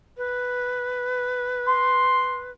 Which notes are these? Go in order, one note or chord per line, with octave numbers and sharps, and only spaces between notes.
B4
C6